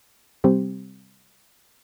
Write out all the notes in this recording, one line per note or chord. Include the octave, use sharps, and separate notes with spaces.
C3 G3 C4 G4 C5